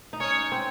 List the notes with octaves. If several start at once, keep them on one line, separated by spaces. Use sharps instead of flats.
D#4
C#4 C#5
C4